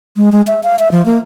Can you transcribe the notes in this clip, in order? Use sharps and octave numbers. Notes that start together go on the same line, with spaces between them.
G#3
G#3
E5
F5
E5
F3
A#3